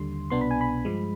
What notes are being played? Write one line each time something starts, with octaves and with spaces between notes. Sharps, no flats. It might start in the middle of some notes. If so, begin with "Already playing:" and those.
Already playing: D#2 D3 G3 C6
C2 B2 B3 D4 C6
B5
G#5
B5
G2 F3 G#3